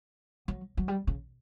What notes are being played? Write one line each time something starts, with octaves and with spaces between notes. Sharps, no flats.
F#3
F#3
G3
C#3